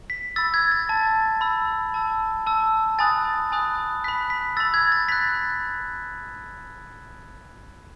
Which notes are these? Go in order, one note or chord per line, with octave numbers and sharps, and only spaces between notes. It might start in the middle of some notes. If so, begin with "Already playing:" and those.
B6
B5 E6 A6
G#6
A6
A5 E6 A6
B5 E6
A5 E6
A5 E6
G#5 B5 D#6 F#6 A6
G#5 B5 D#6 F#6
B5 F#6 B6
B6
B5 E6 A6
G#6
A6
B5 F#6 B6